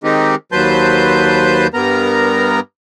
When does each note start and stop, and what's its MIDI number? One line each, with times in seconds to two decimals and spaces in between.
0.04 0.35 51
0.04 0.35 56
0.04 0.35 60
0.04 0.35 63
0.04 0.35 67
0.52 1.67 39
0.52 1.67 54
0.52 1.67 71
0.52 1.67 72
0.52 1.67 81
0.52 1.67 91
1.74 2.60 43
1.74 2.60 59
1.74 2.60 70
1.74 2.60 82